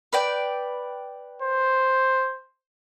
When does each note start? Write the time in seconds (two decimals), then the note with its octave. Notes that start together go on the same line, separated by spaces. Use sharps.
0.13 B4 D5 G5
1.42 C5